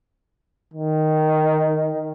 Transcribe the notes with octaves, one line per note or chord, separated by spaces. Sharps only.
D#3